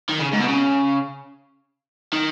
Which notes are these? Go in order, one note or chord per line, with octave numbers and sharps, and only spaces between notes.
D#3
C#3
G#2
B2
C#3
D#3